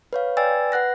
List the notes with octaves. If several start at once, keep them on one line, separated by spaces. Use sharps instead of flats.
B4 C#5 F5
B4 D5 G5 G#5 E6 A6
B4 F#5 F#6 A#6